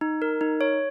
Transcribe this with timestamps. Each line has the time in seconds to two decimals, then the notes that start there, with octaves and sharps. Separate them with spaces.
0.01 D#4
0.22 A#4
0.41 D#4
0.61 C#5